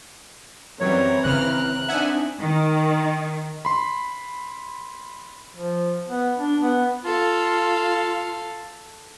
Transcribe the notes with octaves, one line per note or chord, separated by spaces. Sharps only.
F#2 E3 F#3 G3 C4 C#5 A#5
G#1 C#3 F6 F#6
C4 D4 D#4 E5 F#5 G#5
D#3
B5 C6
F3
B3
D4
B3
F4 A4 F5